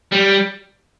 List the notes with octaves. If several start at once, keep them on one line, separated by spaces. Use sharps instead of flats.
G3